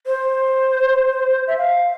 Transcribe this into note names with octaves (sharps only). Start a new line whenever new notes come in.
C5
E5
F5